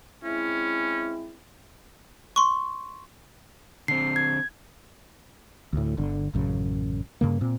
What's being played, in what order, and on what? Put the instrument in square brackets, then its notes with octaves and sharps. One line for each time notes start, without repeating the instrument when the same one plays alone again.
[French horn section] G#3 C4 E4 [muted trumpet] C#4
[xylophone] C6 C#6
[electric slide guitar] D3 C4 [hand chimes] C7
[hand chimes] G#6
[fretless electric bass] D2 A2
G1 D3
A1 F#2 C#3
G2 C#3 A#3
A#2 C4